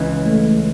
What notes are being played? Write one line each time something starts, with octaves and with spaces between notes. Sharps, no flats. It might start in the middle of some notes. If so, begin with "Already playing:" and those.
Already playing: C#2 C#3 E3
A3